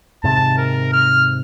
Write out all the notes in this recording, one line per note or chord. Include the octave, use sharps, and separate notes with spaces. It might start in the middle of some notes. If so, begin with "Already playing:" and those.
G#2 C3 D#3 A5
A#4
F6